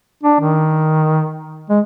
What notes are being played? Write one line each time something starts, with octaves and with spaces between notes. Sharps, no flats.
D4
D#3
G#3